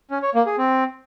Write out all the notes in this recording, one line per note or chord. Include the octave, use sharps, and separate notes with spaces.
C#4
C#5
A#3
G#4
C4